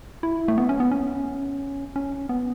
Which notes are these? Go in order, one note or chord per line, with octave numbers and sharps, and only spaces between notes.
E4
A3
B3
C#4
B3
C#4
C#4
B3